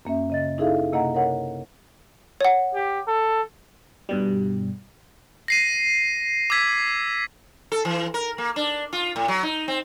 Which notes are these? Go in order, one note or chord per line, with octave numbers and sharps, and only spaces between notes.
F#2 A#3 C#4 E5
C#3 D#5 A6
D#4 E4 G#4 A4 E5 F5
C3 A#3 D#5 F#5 A#5
A#4 C#5 F#5
C#5 F#5
G4
A4
G2 B2 G3
A#6 C7 D#7
D6 E6 G#6 B6
A4
E3
A#4
A#3
D4
F4
A2
F#3
D#4
C4